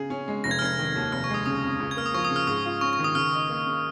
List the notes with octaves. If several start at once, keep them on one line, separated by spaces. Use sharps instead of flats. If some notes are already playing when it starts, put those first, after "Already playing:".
Already playing: C#3 G#4
C#4
G#3
F1 A#6
G#6
F6
F1 G#6
D#3
D#2
F1 F6
C#6
G#3 D#6
C#3 D#6
F2
C#2
G#6
A#3 F6
D#6
F3 C#6
D#6
C#3
F6
G#2 D#6
F4
C#4 C#6
C#6
D#3
D#6
C#2 F6
D#4
A#3
C#3